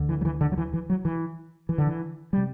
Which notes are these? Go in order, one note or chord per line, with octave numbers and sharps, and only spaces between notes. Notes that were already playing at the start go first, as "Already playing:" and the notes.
Already playing: D2 D3
E3
F#3
E3
D3
F#3
E3
E3
F#3
E3
E3
D3
E3
C3 G3